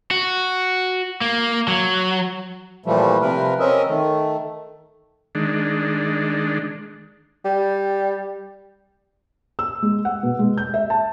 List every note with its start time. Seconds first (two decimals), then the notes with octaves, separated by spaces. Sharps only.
0.11 F#4
1.21 A#3
1.68 F#3
2.86 A#2 E3 F3 G3 A3
3.22 C3 F3 A#4 B4
3.60 C4 C#4 A#4 D#5 E5
3.88 D#3 A3
5.35 D#3 G#3 D4
7.45 G3
9.59 E6
9.82 G#3
10.05 F#5
10.23 B2
10.39 G#3
10.58 G6
10.74 E5
10.90 A5